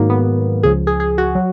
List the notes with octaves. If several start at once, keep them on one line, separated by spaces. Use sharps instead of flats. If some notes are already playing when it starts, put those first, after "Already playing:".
Already playing: G#2 D#3 F#3 A#3
B3
C#2 C#3 F3 G#4
G#4
G#4
F#4
F#3